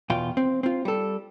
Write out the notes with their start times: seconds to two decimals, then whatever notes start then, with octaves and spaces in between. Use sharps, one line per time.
0.10 E2 B2 F4 G5
0.37 C4
0.63 C4 F4
0.85 G3 A4